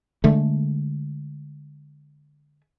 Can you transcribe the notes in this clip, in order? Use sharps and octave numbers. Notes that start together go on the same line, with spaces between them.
D3 G#3 A3